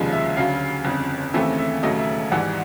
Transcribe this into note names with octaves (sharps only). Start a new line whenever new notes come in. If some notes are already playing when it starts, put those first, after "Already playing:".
Already playing: F1 D#2 C#3 F3 G#3
E5
D2 C#3 F#3 F5
G1 F2 C#3
D#2 C#3 E3 A3 C4 E5
E5
E1 D#2 C#3 F#3 A3 D#5
E5
G#1 G#2 E3 G3 F#5